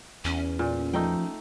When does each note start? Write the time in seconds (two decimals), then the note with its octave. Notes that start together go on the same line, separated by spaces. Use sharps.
0.25 E2 C#4
0.59 A#2
0.93 F3 A3 D#4 G5